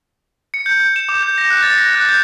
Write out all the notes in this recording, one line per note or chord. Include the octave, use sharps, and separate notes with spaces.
C#7
G6
G6
E7
D6
G6
A#6
F#6
A6
A#6
F#6
G6